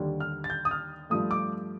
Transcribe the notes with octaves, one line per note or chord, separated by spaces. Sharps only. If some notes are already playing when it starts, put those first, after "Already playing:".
Already playing: D#2 D3 G3
F6
A6
G6
D#6
F6
G2 F3 A3 D#6
D6